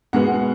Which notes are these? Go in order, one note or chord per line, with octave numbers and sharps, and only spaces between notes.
B2 G#3 B3 F#5